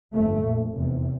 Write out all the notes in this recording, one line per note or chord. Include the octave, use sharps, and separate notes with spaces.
G1 F2 C3 A3
A#1 A#2
F1 E2 C3